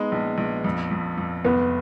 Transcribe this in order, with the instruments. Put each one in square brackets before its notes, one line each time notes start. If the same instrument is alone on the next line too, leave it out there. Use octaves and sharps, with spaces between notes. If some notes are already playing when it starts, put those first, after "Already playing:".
Already playing: [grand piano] G#3 D#4 [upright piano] B3
[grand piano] A#1
A#1
F2
F2
F2
[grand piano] F1 [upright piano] B3